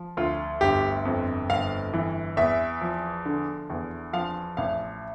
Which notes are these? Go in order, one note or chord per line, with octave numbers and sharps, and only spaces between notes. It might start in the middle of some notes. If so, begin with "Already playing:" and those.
Already playing: F3
D2 F4
G1 G4
F2
G1 F5
E3
E2 E5
F3
D3
E2
F3 F5
A1 F5